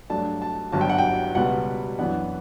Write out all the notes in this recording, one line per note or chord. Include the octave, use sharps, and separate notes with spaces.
G2 F#3 A3 D4 A5
A5
G1 G2 F#3 A5
G5
F#5
G5
C#2 B2 G3 B3 F#5
F#2 E3 B3 D4 F#5